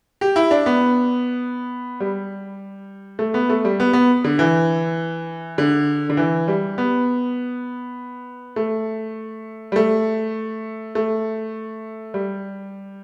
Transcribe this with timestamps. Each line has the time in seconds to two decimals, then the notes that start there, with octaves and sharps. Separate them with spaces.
0.21 G4
0.36 E4
0.51 D4
0.66 B3
2.00 G3
3.19 A3
3.34 B3
3.49 A3
3.65 G3
3.80 B3
3.93 B3
4.24 D3
4.39 E3
5.58 D3
6.10 D3
6.17 E3
6.48 G3
6.78 B3
8.56 A3
9.72 G3
9.76 A3
10.95 A3
12.14 G3